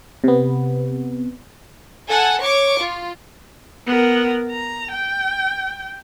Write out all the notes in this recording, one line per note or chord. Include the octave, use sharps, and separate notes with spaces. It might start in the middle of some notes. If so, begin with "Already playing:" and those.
C3 B3
A4 F#5 G#5
C#5 C#6 D6
F4
B3 A#4
A#5
G5